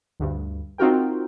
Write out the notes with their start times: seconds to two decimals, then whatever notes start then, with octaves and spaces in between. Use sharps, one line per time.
0.20 D2 G2
0.78 C4 D#4 F4 F#4 A#4 G5